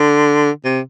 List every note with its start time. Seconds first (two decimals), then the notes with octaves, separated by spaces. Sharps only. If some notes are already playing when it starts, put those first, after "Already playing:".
Already playing: D3
0.65 C3